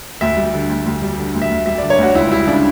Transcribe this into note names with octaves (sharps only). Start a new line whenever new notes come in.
D2 E5
G3
D3
D2
D2
G3
D3
D2
E5
D2
G3 E5
D5
D3
C#5
D2 F#4
C#2 E4
G3 E4
C#3 D4